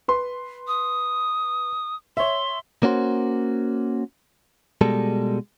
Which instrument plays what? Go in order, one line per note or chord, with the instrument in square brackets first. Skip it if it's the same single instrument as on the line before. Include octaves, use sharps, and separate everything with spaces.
[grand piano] B4 C6
[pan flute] D#6
[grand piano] C#5 E5 [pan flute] C6
[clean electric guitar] A#3 C#4 F#4 C5
B2 G3 G#3 A4